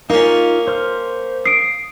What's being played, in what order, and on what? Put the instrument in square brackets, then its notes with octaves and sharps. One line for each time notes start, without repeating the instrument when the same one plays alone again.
[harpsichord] A#3 C#4 [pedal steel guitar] D#4 F4
[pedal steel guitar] C5 F6
[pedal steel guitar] D#6 [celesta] C7 D7